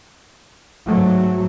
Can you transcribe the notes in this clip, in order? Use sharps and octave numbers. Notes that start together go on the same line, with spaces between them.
G#2 F#3 A3